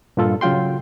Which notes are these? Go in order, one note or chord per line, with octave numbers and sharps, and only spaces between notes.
G2 A#2 F4 A4
C#3 F#3 F4 G5 C6